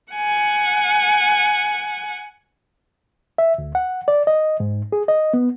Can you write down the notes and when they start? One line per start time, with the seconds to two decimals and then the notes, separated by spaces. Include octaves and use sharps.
0.13 F#5 G#5
3.38 E5
3.58 D2
3.75 F#5
4.08 D5
4.27 D#5
4.60 G#2
4.92 G#4
5.08 D#5
5.34 B3